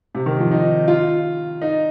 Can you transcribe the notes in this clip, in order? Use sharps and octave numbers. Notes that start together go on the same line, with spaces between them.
C3
D#3
F3
D#4
F4
D#4